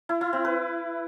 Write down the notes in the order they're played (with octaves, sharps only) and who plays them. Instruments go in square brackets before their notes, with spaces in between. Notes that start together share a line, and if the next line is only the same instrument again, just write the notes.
[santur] E4
E4
C4
B4